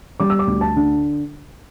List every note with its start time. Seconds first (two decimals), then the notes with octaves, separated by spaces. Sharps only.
0.20 G3 D6
0.30 E6
0.39 D6
0.47 D2
0.61 A5
0.76 D3